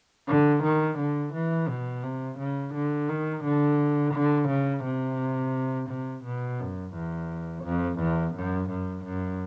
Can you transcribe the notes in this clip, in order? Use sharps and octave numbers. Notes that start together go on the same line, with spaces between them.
D3
D#3
D3
E3
B2
C3
C#3
D3
D#3
D3
D3
C#3
C3
C3
B2
F#2
E2
F2
E2
F#2
F#2
F#2